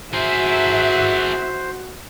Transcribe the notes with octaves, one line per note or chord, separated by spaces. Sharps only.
F#4 G#4 A#4 C5 E5